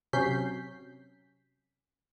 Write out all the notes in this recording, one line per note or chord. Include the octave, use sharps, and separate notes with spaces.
C3 F#3 C#4 G6 B6 C7